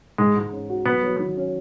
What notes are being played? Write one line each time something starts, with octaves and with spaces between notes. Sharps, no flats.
G#2 G#3
G#2
C#4
F#4
F#3 B3
F#3
D#3
C#4